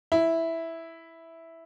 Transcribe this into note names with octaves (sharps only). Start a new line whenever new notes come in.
E4